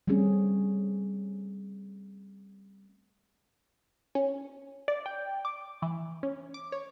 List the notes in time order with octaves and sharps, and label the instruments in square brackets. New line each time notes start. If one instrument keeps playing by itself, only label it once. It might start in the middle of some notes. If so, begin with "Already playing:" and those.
[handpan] G3 A3 C4 C#4 G#4
[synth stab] C#4
D5
G5
D6
E3
C#4
D6
C#5